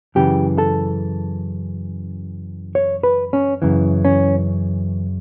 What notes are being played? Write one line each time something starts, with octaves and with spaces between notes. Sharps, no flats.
F#2 C#3 E3 G4
A4
C#5
B4
C#4
F#2 C#3 E3
C#4